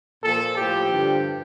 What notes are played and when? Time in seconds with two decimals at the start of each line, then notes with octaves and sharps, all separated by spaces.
0.22 A#2 F3 A4
0.56 A2 F3 G4
0.90 G2 D3 F3